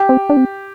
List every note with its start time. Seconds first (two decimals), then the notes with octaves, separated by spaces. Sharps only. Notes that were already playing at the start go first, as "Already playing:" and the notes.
Already playing: G4
0.09 C4
0.29 D4
0.37 C4